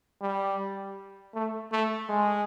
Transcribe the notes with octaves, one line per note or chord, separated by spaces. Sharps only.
G3
A3
A3
G#3